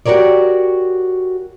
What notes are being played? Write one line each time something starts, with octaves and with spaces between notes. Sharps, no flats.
F#4 G4 A#4 C#5 D5